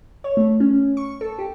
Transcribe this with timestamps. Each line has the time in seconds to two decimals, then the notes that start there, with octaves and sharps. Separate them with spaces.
0.24 C#5
0.37 A3
0.60 C#4
0.97 C#6
1.21 A4
1.39 G4